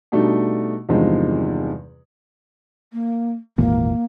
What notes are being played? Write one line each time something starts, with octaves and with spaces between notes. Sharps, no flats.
B2 G3 A3 D4 D#4
E2 G2 C3 D#3 F3 G#3
A#3
G#1 E2 A#2 A#3